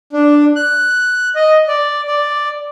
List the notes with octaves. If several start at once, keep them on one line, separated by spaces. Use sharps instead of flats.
D4
F#6
D#5
D5
D5